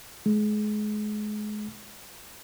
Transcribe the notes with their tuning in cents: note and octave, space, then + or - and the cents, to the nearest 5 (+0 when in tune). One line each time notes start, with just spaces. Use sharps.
G#3 +30